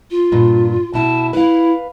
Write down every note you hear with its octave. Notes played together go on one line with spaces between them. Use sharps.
F4
G2 A#2
B2 E4 A5
E4 B4 F5